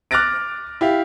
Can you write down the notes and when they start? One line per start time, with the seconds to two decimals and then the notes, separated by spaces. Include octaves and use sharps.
0.11 D6 F6 F#6 A6 A#6 D7
0.81 E4 G4 F5